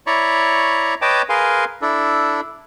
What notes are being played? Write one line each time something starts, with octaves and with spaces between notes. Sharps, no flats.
E4 C#5 D5 A#5 B5 C#6
B4 C#5 D#5 G5 A5 D6
G#4 A#4 B4 F5 G#5 C6
D4 E4 A4